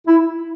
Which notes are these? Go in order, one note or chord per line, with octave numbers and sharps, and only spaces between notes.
E4